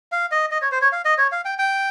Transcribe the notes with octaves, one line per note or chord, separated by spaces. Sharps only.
F5
D#5
D#5
C#5
C5
C#5
F5
D#5
C#5
F5
G5
G5